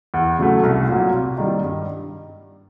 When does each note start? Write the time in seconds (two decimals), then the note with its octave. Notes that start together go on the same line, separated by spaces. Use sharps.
0.14 E2
0.39 C#3 F#3 A3
0.63 C2
0.88 A#2 F#3 A#3
1.13 C3
1.38 D#3 G3
1.63 G2